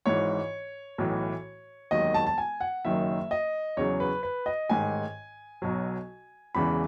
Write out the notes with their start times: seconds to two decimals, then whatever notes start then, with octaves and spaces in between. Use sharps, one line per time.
0.06 G#1 G#2 E3 C#5
0.98 B1 A2 E3
1.91 E1 D#2 D#3 F#3 D#5
2.14 A5
2.27 A5
2.38 G#5
2.61 F#5
2.85 F#1 F#2 D#3 F#3 E5
3.31 D#5
3.77 E2 C#3 F#3 C#5
4.00 B4
4.23 B4
4.46 D#5
4.69 A1 G#2 D#3 G#5
5.62 B1 B2 F#3
6.55 E1 E2 C#3 E3 B5